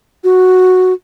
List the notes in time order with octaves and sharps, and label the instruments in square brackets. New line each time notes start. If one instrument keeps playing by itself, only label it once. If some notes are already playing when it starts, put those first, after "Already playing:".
[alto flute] F#4